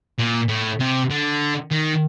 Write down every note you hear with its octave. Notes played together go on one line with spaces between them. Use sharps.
A#2
A2
C3
D3
D#3